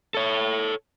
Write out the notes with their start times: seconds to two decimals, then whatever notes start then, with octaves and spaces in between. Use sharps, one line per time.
0.14 A4 C#5